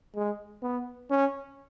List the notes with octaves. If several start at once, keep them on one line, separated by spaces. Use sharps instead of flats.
G#3
B3
C#4